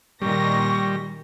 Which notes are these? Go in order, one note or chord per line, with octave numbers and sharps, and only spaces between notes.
A#2 D#3 G3 C#6 A#6